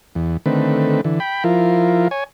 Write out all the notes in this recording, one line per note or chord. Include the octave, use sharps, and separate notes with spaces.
E2
D3 D#3 A3 C4 B4
D3 E3
G5 B5
F3 E4 F4 A#4
C#5 G#5